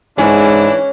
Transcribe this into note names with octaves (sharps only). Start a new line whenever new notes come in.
G#2 E3 C#4 D4 E4 G#4